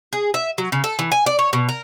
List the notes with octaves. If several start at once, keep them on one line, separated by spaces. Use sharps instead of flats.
G#4
E5
F#3
C#3
A4
E3
G#5
D5
C#5
B2
A#4